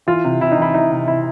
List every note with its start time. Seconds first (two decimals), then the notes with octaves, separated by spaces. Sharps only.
0.07 E3 F4
0.24 C3
0.41 C3 E4
0.52 D#4
0.58 E3 E4
0.74 E3 D#4
0.90 C3
1.08 C3 E4